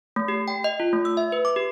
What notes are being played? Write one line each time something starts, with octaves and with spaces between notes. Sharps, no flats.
A3
G4
G5
D#5
F4
A3
E6
E5
B4
D6
G4